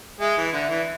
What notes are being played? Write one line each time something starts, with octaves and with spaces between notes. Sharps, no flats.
G#3 E5
E3
D3 E5
E3